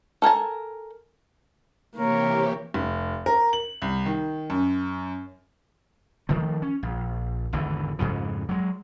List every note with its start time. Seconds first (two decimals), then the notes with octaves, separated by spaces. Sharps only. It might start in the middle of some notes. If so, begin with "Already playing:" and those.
0.22 A4 A#4 G#5 A5
1.96 C3 E3 A#3 G4 A#4 C#5
2.74 F1
3.26 A#4
3.53 F#7
3.82 C2
4.06 D#3
4.50 F#2
6.29 D#3 F3 A3
6.62 C#4
6.83 A#1
7.53 G#1 E2 D3 E3
7.99 F2 G#2 C#3 E3
8.49 F#3 G#3